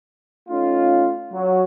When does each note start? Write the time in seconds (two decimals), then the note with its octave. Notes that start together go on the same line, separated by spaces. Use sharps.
0.49 A3 C#4 D#4 F4
1.33 F#3